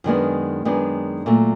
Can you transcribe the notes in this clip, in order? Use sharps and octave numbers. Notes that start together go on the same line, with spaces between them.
F#2 D#3 G#3 B3 D4
F#2 D#3 G#3 B3 D4
A#2 F#3 A3